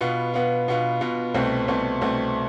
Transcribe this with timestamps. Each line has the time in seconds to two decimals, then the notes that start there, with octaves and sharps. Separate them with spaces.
0.01 B2 B3 F4
0.34 B2 B3 F4
0.68 B2 B3 F4
1.01 B2 B3 F4
1.34 C2 B2 A3 C4
1.68 C2 B2 A3 C4
2.01 C2 B2 A3 C4